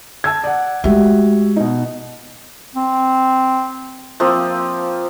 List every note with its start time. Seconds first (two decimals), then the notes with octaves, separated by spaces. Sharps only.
0.24 A5 E6 G#6
0.44 D5 F#5
0.84 G#3 A3 F#4 G4 E5
1.56 B2 D#4
2.75 C4
4.20 F3 A#3 C4